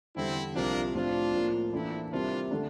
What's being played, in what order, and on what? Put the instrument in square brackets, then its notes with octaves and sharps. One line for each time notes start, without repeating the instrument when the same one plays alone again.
[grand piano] E2 D3 G3 [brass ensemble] C4 E4
[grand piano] C2 C3 F3 C4 [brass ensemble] A#3 D4
[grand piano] A2 F3 C4 [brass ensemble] D4 F4
[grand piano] A2 F3 A#3
[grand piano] E3 A#3 D4 A4 [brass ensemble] C4 E4
[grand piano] C3 G3 C4 E4 A#4 [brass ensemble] D4 F4
[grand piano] D3 A3 D4